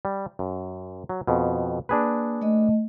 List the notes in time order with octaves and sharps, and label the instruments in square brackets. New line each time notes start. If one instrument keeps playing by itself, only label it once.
[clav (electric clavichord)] G3
F#2
F#3
F2 B2
[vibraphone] A#3 [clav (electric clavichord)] D4 G#4 B4
[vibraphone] A3 D#5